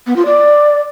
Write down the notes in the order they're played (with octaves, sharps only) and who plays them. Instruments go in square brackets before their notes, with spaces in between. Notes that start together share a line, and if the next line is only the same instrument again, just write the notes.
[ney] B3
F4
D5